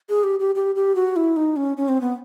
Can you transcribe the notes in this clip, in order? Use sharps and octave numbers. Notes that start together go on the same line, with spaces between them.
G#4
G4
G4
G4
G4
F#4
E4
D#4
C#4
C#4
C4
B3